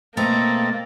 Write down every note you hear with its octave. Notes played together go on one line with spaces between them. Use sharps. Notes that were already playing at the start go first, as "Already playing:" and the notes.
B2 A3 A#3 C4 D#5 A#5 A6